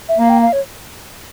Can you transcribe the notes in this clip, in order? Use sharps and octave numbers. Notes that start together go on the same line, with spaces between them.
E5
A#3 F5
G5
F5
C#5